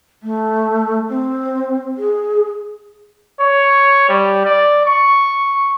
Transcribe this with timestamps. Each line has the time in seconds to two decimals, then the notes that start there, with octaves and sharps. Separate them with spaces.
0.23 A3
1.09 C4
1.97 G#4
3.40 C#5
4.08 G3
4.45 D5
4.86 C#6